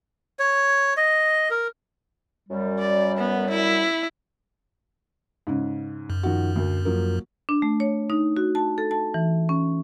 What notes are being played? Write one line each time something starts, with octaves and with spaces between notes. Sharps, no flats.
C#5
D#5
A#4
F#2 G3
D5
B3
E4
G#2 C#3 C#4
F#2
D#3 F3 F#4
D2 A#4
F3 F#3 A#3
D4
A3
C#5
D#4
F#4
A5
A4
A5
E3
C#4